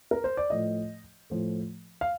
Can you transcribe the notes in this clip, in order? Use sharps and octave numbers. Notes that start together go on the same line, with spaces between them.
A#4
C5
D5
A2 F3 A3 D#5
A2 F3 A3
F5